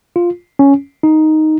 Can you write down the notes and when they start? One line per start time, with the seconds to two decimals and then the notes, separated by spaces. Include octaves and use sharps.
0.16 F4
0.59 C#4
1.03 D#4